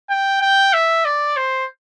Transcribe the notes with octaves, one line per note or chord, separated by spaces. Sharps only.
G5
G5
E5
D5
C5